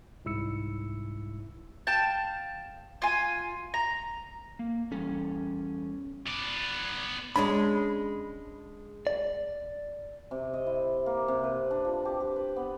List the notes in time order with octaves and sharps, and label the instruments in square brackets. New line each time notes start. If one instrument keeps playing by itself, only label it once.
[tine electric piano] C2 G#2 E4 E6 C#7
[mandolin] F5 G5 A5
F4 G#5
A#5
[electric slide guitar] A#3
[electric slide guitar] E2 G3 A4 [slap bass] C#4
[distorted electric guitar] B3 D5
[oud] G#3 C#4 D4 [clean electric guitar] B5
[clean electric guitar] D5
[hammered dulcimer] C3
D#5
E4
A#3
C3
B4
D4
F3
G4
G4
B4
B3